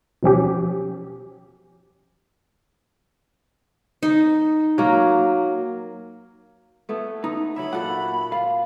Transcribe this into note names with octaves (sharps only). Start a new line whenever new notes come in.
B2 F3 C#4 G4
D#4
F#3 A#3
A3 B3 E4
B3 D#4
F#3 C#5 E5 B5
A#2 A4 F#5
F4 F5